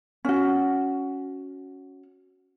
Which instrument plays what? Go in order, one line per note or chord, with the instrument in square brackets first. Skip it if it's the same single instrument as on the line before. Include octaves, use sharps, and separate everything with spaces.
[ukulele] C#4 F#4